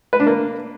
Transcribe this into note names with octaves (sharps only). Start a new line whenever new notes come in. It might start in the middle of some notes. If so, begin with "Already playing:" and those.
B4
D4
A#3